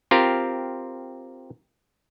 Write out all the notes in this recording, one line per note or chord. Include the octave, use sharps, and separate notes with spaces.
C4 F4 G4 A#4